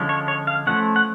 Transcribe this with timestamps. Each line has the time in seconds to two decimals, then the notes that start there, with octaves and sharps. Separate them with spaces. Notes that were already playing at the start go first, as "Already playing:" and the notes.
Already playing: D3 F3 G#3 C#4
0.09 C#5
0.28 C#5
0.47 F5
0.67 F3 A3 C#4 F#5
0.96 F#5